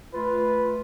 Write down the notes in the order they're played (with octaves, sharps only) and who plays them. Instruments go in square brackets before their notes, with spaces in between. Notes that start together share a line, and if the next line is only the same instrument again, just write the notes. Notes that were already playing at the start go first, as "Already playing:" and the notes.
[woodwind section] A3 F4 [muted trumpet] B4